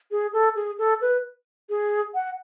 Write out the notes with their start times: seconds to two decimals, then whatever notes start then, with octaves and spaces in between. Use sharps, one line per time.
0.11 G#4
0.33 A4
0.56 G#4
0.78 A4
1.01 B4
1.69 G#4
2.14 F#5